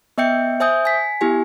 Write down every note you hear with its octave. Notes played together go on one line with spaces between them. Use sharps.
B3 D#5 E5 G5 G6 C#7
C5 E5 G#5 D#6 G6
G#5 B6
B3 E4 G4 G#5